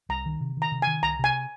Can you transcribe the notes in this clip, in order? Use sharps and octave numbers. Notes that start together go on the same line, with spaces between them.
C2 A#5
D#3
C3
D#3 A#5
C3
G#5
D#3
C2 A#5
C3 G#5